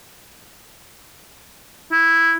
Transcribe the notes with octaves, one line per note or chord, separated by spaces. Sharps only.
E4